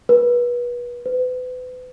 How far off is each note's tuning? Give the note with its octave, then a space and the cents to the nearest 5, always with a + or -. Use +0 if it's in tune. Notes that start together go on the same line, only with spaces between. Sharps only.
B4 -30
B4 +35